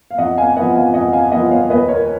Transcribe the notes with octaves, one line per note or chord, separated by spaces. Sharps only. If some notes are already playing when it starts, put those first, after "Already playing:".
F5
F2 D#5 F#5
F5 G#5
F3 B3 D#5 F#5
F5 G#5
F2 D#5 F#5
F5 G#5
F3 B3 D#5 F#5
C#5 F5
D#2 B4 D#5
A#4 C#5